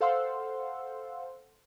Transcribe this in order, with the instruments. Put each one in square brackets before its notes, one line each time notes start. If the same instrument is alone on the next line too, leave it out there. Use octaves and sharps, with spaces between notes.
[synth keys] A4 C5 F5 F#5 C6 E6